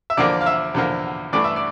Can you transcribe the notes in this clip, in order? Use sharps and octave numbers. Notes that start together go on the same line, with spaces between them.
E5
E2 D3 F3 A#3 D5
F5
E5
E2 D3 F3 A#3
G2 E3 A3 D4 D5
E5
D5